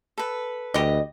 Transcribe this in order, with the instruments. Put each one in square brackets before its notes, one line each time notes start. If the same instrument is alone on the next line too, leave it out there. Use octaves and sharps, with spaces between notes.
[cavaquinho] A4 B4
[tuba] D2 [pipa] G4 D#5